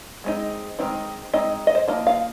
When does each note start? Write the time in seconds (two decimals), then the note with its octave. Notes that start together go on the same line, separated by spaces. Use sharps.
0.24 G#3 C4 D#4
0.79 D#3 G#3 C4 D#4
1.33 G#3 C4 D#4 D#5
1.67 D#5
1.75 C5
1.88 F3 A#3 D#4 D#5
2.07 F5